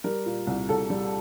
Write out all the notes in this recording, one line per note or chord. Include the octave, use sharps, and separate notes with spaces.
G3 A#4
A#2
C2
C2 A4
G3